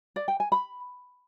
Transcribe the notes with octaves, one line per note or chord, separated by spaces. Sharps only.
D5
G5
G#5
B5